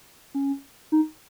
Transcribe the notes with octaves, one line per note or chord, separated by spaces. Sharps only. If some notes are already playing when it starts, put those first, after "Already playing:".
C#4
D#4